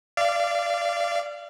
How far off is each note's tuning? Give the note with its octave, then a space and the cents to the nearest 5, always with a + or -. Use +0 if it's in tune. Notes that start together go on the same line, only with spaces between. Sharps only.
D5 +0 F5 -30